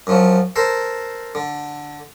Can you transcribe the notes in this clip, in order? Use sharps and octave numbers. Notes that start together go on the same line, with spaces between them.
F#2 F3 F#3
A4 A#4 C5
D3